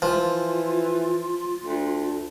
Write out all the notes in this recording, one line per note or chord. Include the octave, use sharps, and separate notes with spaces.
E3 F3 F4
D2